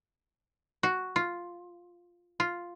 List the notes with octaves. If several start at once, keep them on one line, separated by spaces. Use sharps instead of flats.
F#4
F4
F4